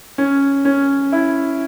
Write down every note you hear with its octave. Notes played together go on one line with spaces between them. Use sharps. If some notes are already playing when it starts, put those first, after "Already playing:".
C#4
C#4
E4